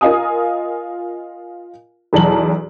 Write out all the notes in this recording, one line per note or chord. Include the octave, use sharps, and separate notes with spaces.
F4 A#4 D#5 F5 G#5 D#6
B1 E2 A5 A#5 F#7